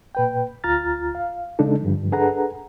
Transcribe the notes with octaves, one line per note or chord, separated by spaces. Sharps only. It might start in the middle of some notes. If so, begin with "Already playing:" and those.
A#2 B4 G5
D2 F4 A#5 F6 A6
F5
C#3 G#3 D4 D#4 A4
G2 D3 F3
D4 G#4 A4 B4 F#5 A#5